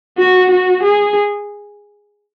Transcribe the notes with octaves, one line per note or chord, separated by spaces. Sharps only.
F#4
F#4
G#4